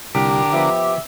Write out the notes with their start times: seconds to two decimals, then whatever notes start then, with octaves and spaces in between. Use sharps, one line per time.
0.15 C2 D3 G4 A#4
0.53 F3 B3 E5